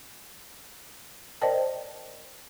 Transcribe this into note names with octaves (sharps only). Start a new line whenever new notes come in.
A#4 C5 D5 D#5 G5 A5